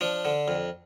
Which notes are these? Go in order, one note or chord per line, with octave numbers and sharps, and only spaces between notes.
F3 D4
D3
F2